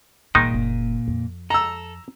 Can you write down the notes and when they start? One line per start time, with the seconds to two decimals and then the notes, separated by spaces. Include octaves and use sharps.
0.35 G1 G2 A#2 D#3 G#3 D#4
0.54 F#1
1.08 F2
1.50 A4 A#5 E6